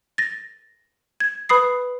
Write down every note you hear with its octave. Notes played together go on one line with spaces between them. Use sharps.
A6 A#6
G#6
B4 B5 D#6 C7